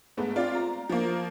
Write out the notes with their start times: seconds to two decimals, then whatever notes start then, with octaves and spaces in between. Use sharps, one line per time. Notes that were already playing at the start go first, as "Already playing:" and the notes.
0.17 G#2 A3 B3
0.35 C4 F4 D5 F5
0.55 A#5
0.89 F3 A#3